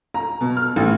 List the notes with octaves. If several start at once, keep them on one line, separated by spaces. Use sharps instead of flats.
A#5
B2
F6
A1